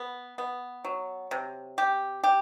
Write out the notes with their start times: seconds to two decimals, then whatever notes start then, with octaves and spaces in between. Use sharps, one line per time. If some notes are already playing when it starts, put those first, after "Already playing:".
Already playing: B3
0.38 B3
0.84 F#3
1.31 C3
1.78 G4
2.23 G4